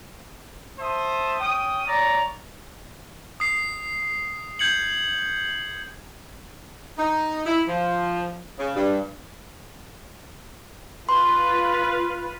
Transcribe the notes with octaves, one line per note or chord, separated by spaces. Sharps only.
C5 E5 A5 D#6
C#4 G5 D#6
C#5 D5 A#5
D#6 C7
G6 G#6 C#7 F#7
D#4
E4
F3
C#3
G2
F4 B4 C6